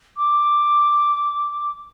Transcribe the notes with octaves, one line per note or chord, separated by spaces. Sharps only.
D6